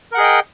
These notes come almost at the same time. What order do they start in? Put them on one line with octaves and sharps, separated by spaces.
A#4 F#5 G#4 D#5 G5